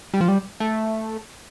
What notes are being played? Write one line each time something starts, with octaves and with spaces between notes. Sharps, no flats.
G3
F3
G3
A3